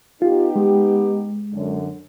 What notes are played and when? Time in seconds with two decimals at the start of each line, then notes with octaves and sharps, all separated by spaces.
0.22 B3 D#4 F4 G4
0.56 G#3
1.53 F#2 D3